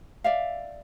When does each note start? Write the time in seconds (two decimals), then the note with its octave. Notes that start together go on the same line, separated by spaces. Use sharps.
0.24 D5 E5 F5